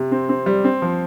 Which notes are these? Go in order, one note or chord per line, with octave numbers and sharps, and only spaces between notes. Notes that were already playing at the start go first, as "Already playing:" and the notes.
Already playing: C3
C4
C4
G3
C4
F3